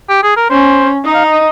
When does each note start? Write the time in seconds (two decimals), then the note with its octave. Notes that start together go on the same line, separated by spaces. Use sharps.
0.09 G4
0.23 G#4
0.36 A#4
0.50 C#4 C5
1.05 D#4 D#5
1.15 F5
1.25 D#5